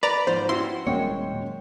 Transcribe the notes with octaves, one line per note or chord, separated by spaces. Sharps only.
B4 D5 A#5
G#2 F3 C5
C#4 E4 F#4 G4 C6
D#1 F#2 A#2 G#3 C#4 C#5 G5